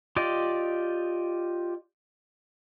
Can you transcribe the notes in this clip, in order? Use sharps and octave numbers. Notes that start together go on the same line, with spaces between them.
F4 G4 D5 D#5